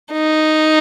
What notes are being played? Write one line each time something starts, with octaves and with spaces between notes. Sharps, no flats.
D#4